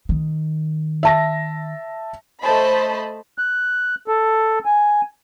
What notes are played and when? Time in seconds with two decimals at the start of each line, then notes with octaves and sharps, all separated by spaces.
0.09 D#3
1.03 E5 A5 A#6
2.41 A3 C5 D#5 A5 B5
3.38 F#6
4.08 A4
4.65 G#5